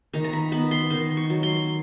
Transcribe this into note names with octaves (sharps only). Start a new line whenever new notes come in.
D#3 A#5
A#5
B5
B3 B5
C6
D#3 C6
C#6
F#3
C6